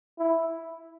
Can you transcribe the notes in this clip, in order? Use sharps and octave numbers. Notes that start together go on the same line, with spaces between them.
E4